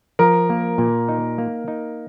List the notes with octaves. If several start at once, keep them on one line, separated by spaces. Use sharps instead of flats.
F3 A#4
A#3
A#2
D#4
A#3
D#4